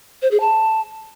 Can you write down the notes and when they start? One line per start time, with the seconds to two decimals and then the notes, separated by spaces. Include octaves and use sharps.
0.22 C5
0.31 G#4
0.40 A5